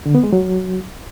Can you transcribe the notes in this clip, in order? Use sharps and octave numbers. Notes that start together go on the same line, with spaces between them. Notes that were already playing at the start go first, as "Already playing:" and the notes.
D3
B3
G#3
F#3